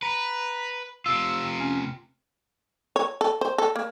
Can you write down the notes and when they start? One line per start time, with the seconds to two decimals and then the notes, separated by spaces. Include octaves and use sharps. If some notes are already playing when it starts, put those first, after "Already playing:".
0.02 B4 A#5
1.06 C3 F4 E6
1.59 C#4
2.96 C#5
3.21 A4
3.41 C5
3.58 A4
3.76 A#3